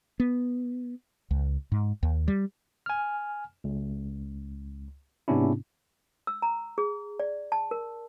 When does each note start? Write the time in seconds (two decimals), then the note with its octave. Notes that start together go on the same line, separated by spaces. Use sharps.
0.20 B3
1.31 C#2
1.72 G#2
2.03 D#2
2.28 G3
2.86 G#5 F6
3.64 C#2
5.28 G#2 C3 B3 C#4 D4 E4
6.27 E6
6.42 A#5
6.78 G#4
7.20 D5
7.52 A5
7.71 A#4